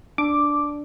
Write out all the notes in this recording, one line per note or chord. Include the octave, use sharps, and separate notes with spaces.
D4 D6